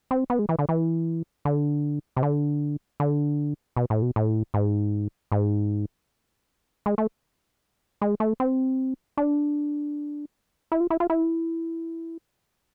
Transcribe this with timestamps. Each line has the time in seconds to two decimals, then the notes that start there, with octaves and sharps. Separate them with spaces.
0.11 C4
0.30 B3
0.39 G#3
0.49 E3
0.59 D3
0.69 E3
1.45 D3
2.16 C3
2.23 D3
3.00 D3
3.76 B2
3.90 A2
4.02 B2
4.16 A2
4.54 G#2
5.32 G#2
6.86 G#3
6.98 A3
8.02 G#3
8.20 A3
8.40 C4
9.17 D4
10.72 E4
10.80 F4
10.90 E4
11.00 F4
11.10 E4